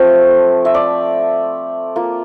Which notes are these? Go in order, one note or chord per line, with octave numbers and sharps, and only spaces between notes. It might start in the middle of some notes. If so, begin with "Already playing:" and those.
Already playing: F3 A3 C4
E5
D5
A#3 F4